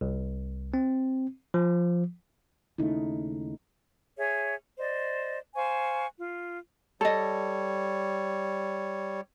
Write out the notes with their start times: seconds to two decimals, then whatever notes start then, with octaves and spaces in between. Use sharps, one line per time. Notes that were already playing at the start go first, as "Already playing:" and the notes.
0.01 C2
0.74 C4
1.54 F3
2.78 D#2 C#3 A3 D#4 E4
4.17 G#4 C#5 E5
4.78 C5 D5 D#5
5.55 C5 F5 G#5 C#6
6.18 F4
7.01 G3 A4 C#5 D#5